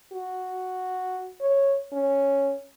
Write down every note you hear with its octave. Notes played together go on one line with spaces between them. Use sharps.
F#4
C#5
C#4